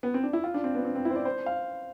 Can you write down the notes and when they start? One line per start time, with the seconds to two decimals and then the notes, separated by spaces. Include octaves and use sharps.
0.03 B3
0.14 C4
0.23 D4
0.33 E4
0.44 F4
0.54 D4
0.64 C4
0.75 B3
0.85 C4
0.95 C4
1.05 E4
1.11 C5
1.16 D5
1.25 C5
1.46 F5